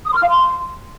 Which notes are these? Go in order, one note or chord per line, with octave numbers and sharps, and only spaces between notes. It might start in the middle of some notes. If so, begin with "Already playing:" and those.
D#6
C6
F6
F5
C6